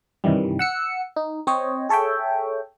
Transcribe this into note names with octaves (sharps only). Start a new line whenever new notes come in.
G2 C3 D#3 E3 G3
F#5 E6 C#7
D#4
C4 C5 C#5 D#5
G#4 A4 C#5 E5 G5